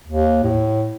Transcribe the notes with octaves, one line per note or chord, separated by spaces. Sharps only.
D#2
A2